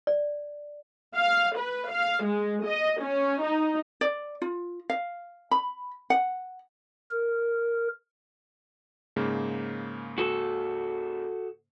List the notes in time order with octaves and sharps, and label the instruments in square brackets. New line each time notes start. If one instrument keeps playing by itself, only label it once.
[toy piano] D5
[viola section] F5
B4
F5
G#3
D#5
C#4
D#4
[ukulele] D5
F4
F5
B5
F#5
[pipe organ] A#4
[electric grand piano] G#2 C#3 A#3
[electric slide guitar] F#4 A4